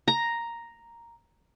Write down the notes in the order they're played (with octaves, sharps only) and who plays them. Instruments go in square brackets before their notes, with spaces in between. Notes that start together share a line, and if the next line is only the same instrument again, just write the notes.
[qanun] A#5